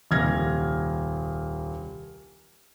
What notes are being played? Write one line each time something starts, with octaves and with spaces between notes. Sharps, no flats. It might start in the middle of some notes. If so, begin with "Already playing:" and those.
D#1 C2 F6 G#6 A#6